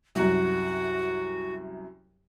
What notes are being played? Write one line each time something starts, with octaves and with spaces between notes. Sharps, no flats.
C2 F#2 F#4